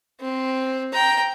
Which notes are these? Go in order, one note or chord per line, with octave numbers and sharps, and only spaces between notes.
C4
G5 A#5